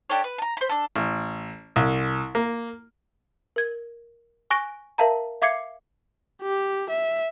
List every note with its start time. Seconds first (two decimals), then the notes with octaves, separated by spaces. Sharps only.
0.09 D4 G4 A4 C#5
0.24 B4
0.38 A5 A#5
0.57 C5 B5
0.69 D4 A4
0.96 A1
1.76 C2
2.35 A#3
3.56 A#4 G#6
4.50 G#5 C#6 F#6 A#6 D7
4.98 A#4 E5 F5 A5 A#5
5.42 E5 F5 D6 G#6 C7 C#7
6.42 G4
6.90 E5